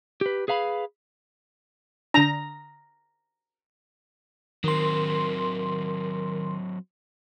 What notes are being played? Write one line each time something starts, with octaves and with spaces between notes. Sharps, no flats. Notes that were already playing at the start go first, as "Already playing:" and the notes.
G4 B4
G#4 B4 F5 A#5 B5
D3 D4 A#5
D#3 F#3 C4 A#4 C6